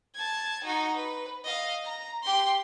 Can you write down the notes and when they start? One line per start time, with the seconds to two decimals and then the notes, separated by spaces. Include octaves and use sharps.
0.15 A5 G#6
0.64 D#4 F#4
0.95 B4
1.44 D#5 F5
1.85 A#5
2.23 G4 C6